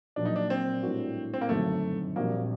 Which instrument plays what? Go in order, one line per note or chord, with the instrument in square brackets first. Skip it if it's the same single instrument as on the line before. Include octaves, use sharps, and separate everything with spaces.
[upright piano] A#1 A#2 F#3 [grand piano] D4
[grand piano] D#4
D4
C4
[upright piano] A2 G3 D4 F#4 A#4
[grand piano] C4
A#3
[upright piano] G1 F#2 D#3 F#3 C4 [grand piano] A3
[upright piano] A#1 A#2 G3 C4 F#4 [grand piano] A#3